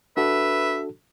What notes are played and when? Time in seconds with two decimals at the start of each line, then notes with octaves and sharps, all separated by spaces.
0.17 D4 F#4 A4 B4 E5